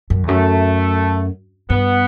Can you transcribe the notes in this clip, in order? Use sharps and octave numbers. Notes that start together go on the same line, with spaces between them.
F#2
E2
F#2 A3
G2 B3